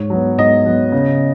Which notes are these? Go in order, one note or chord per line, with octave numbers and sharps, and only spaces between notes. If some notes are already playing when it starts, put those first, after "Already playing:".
Already playing: G#2 C#5
F#3 B3
G#2 D#5
F#3 B3
C#3